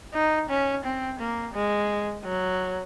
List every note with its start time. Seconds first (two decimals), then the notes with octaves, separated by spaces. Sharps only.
0.14 D#4
0.49 C#4
0.84 C4
1.19 A#3
1.54 G#3
2.25 F#3